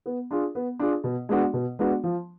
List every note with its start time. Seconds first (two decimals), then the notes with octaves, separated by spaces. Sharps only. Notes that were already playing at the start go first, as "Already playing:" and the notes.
0.06 B3
0.31 D4 F4 G#4
0.55 B3
0.79 D4 F4 G#4
1.04 B2
1.29 G#3 B3 D4 F#4
1.53 B2
1.79 G#3 B3 D4 F#4
2.03 F3